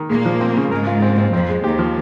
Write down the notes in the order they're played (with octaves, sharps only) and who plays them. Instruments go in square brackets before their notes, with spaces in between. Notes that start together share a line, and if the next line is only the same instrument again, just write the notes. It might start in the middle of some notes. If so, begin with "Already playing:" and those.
Already playing: [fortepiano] D#3
[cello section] A#2 A#3 [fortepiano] G#3
[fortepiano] F3
C4
C#3
[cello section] G#2 G#3 [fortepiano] A#4
[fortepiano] F4
C4
C4
[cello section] F2 F3 [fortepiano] C4
[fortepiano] G#3
[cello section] D#2 D#3 [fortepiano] G4
[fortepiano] F3